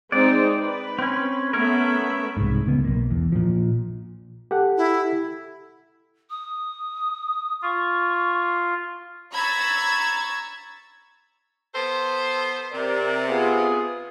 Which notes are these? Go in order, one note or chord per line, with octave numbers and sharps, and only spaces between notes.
G#3 C4 D#4 D5
B4
C4 C#4
A3 B3 C#4 A#4 E5
C2 G#2
C#2 C#3 B3
B1 A#3
E2
A#2 F3
G4 A4 F#5
E4
D#6
F4 C#6
A#5 B5 C#6 E6 G#6 A6
B3 A4 C5
C3 A#4 D5
B3 F4 G#4